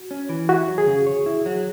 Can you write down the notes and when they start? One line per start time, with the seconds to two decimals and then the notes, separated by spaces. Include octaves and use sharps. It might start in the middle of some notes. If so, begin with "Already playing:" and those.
Already playing: F#4
0.11 C#4
0.29 E3
0.49 E4 F#4
0.68 F#3
0.78 G#4
0.87 C#3
1.07 C#5
1.26 E4
1.46 F#3